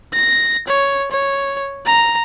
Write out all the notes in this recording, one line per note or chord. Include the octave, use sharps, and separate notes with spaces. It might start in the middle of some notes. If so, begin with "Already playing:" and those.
A#6
C#5
C#5
A#5